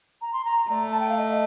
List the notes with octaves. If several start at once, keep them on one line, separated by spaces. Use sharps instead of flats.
A#5
C6
A#5
A3 D5
A5
G5
F5
D#5